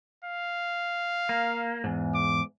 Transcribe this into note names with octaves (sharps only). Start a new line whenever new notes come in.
F5
A#3
E2 G#2
D6